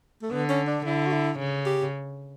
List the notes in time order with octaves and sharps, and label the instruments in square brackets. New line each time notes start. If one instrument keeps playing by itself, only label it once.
[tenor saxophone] A3
[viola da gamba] D3 [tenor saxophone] B3
[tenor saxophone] C#4
D4
[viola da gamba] D3 [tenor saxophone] E4
[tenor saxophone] F#4
E4
[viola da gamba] C#3
[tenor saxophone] G4